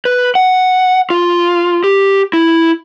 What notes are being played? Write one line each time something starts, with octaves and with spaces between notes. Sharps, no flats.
B4
F#5
F4
G4
E4